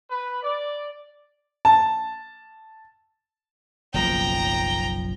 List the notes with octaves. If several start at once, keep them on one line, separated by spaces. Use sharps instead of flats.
B4
D5
A5
F#1 B1 F3 G5 A#5